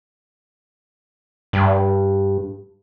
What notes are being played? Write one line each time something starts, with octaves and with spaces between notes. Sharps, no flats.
G2